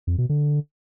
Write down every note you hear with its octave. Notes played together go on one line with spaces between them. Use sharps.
F2
B2
D3